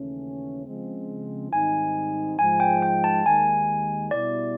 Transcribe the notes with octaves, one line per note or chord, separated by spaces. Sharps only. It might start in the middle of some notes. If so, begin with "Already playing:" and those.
Already playing: D#2 C#3 E3 A3 C#4
C#3 F3 G#3 C4
G#2 D#3 G3 C4 D#4 G#5
G#2 F3 G#3 G#5
G5
G5
A5
D#2 D#3 G#3 G#5
B2 G3 B3 E4 D5